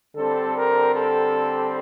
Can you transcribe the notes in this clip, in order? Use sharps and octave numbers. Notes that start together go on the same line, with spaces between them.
D3 G3 C4 A4
A#4
A4